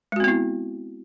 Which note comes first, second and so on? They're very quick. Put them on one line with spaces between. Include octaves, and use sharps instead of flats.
G#3 F#4 C4 B3 E4